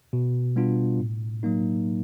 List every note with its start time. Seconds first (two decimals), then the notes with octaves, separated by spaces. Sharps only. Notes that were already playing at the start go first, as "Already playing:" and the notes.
0.13 B2
0.56 G3 B3 D4 F4
1.00 A2
1.43 F#3 A#3 D#4